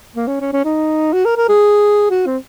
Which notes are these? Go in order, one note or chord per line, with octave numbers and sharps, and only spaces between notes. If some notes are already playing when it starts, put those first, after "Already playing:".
A#3
C#4
C#4
C#4
D#4
F#4
A#4
A#4
G#4
F#4
C4